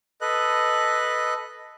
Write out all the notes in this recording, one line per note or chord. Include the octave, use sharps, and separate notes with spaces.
A4 B4 D#5 F#6